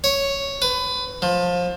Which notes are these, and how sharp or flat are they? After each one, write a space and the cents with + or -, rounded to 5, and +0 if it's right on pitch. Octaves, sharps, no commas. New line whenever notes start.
C#5 +0
B4 +25
F3 +20